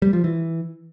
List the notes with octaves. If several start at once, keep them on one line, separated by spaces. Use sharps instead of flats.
G3
F3
E3